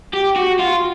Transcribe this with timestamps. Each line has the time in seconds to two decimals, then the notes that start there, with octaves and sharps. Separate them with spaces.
0.13 G4
0.36 F#4
0.59 F4